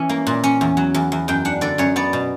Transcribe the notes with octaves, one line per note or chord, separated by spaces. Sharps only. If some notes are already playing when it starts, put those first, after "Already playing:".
Already playing: E3 C#4
A#3
A#2
C#4
E2
F#3
E2
E2
F#2 G5
D4 F#5
D3 D5
F#2 C#5
B3 D5
B2